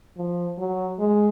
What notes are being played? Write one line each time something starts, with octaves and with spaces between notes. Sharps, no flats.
F3
F#3
G#3